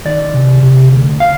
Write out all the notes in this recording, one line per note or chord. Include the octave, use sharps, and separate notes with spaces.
D#3 D5
C3
C3
D2
F5